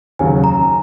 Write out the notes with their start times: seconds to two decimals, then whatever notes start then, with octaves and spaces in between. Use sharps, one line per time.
0.19 D#2 C#3 F#3 C#4 G#5
0.44 A#5